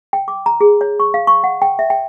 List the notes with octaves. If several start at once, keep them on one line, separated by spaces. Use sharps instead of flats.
G5
D6
A#5
G#4
C#5
C#6
F5
C#6
F#5
G5
E5
G5